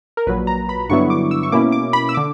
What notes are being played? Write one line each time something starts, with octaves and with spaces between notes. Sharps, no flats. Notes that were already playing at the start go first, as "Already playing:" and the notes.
A#4
A#1 A#2 F#3 B4
A#5
B5
G2 D3 F#3 B3 E4 C#6
D6
E6
C#6
B2 A#3 C#4 E4 D6
D6
B5
E6
D3 D6